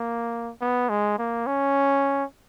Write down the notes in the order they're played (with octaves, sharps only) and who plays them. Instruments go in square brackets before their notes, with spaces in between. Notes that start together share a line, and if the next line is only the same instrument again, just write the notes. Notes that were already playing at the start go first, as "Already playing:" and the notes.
Already playing: [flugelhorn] A#3
B3
G#3
A#3
C#4